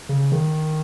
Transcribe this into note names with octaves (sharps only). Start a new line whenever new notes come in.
C#3
D#3